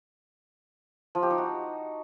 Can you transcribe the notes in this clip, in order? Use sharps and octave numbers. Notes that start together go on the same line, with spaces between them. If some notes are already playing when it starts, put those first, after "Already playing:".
F3
G4
D#4
F#4